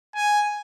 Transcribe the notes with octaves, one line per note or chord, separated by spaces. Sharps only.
G#5